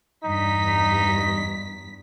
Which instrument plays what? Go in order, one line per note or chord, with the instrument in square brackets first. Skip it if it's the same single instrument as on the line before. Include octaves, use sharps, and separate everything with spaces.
[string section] E2 G2 B6 [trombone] D#4